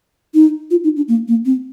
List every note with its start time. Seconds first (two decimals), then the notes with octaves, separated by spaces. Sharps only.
0.34 D#4
0.71 F4
0.84 D#4
0.97 D4
1.08 A#3
1.28 A#3
1.46 C4